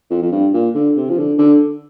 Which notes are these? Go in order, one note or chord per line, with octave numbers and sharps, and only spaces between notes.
F2
F2
G2
A#2
D3
C3
F3
D3
D3